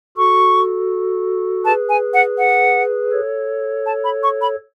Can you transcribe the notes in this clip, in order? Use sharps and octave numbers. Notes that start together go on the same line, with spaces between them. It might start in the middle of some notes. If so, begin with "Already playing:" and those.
F#4 A4 C#6
G#4 B4 A5
G#5
F#5
F#5
A4 C#5
A5
B5
C#6
B5